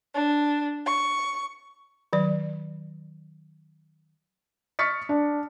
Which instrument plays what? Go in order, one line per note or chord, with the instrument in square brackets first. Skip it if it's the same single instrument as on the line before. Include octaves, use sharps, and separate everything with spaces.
[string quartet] D4
C#6
[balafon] D#3 F#3 D5
[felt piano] C#6 F6 A6 B6 C#7
D4